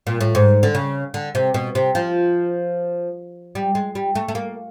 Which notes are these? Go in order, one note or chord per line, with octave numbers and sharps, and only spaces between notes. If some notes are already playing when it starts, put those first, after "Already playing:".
A#2
A2
G#2
D3
C#3
D3
C3
B2
C3
F3
G3
G#3
G3
A3
A3
A#3